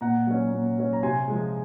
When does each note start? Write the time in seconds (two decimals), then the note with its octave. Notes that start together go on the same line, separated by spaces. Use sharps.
0.01 A#2 F#5 A#5
0.27 F#3 C#4
0.52 A#2
0.78 F#3 C#4
0.93 A#5
1.03 C3 G#5 C6
1.28 F3 G#3